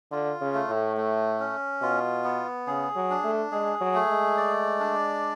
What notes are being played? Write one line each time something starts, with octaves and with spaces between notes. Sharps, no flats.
D3 F4
C#3
A3
A2
A3
C#4
B2 F4
B3
C#3 G#4
F#3
D4
A3
G#3 G#4
F#3
A3
G#3
D5
D4